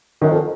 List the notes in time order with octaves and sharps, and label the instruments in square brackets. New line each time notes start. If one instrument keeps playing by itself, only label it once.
[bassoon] F#2 [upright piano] D#3
[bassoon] F2